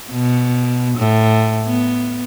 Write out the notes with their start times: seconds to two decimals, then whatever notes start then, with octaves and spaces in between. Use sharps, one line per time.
0.12 B2
0.98 A2
1.66 B3